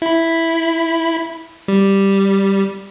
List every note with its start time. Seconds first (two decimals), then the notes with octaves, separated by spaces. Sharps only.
0.02 E4 B5
1.68 G3